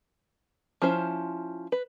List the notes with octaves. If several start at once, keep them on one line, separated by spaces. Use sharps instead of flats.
F3 C#4 E4 C5
B4